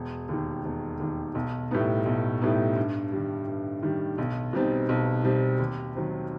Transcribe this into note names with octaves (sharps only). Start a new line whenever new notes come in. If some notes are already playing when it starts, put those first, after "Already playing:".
Already playing: E1
D#2 D#3
E1
D#2 D#3
B1
A2 G3 B3 D#4
B1
A2 G3 B3 D#4
G2
D#3 G3
G2
D#3 G3
B1
B2 G3 C4 D#4
B1
B2 G3 C4 D#4
D#2
D#3 F#3 C4